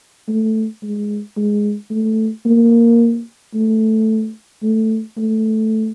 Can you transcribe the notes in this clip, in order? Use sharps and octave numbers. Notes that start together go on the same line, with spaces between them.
A3
G#3
G#3
A3
A#3
A3
A3
A3